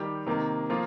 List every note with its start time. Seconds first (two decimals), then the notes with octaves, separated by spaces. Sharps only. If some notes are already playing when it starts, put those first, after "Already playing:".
Already playing: D#3 G3 D#4 G4
0.26 C3 D#3 A#3
0.70 F3 A#3 F4